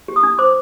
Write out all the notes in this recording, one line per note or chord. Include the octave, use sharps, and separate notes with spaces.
G4
D#6
D4
C5 D6